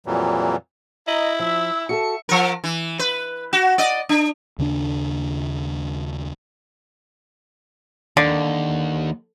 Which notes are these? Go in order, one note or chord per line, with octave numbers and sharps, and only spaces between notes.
F2 A#2 E3 F#3 G3
E4 D#5 A#5
F3 E5 E6
F#4 G#4 A4 E5 C#7
F3 A#4
E3
B4
F#4
D5 D#5
D4
D#2 C#3 A3 D4
D#2 D3